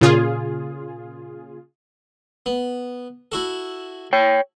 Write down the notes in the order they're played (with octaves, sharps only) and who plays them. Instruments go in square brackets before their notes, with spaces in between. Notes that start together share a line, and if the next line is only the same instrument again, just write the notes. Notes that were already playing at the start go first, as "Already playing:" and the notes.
[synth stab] A#2 C#3 F4 G#4
[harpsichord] B3
E4 F#4 A4
[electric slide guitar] C#5 G5